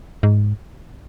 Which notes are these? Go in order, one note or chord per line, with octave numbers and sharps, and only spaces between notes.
G#2